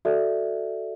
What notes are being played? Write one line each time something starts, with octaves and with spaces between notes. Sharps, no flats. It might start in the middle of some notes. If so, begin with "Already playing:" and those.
F#4 A4 D5 E5